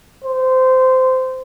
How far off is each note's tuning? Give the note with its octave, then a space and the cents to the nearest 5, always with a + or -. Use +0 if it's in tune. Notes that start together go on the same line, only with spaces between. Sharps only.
C5 -20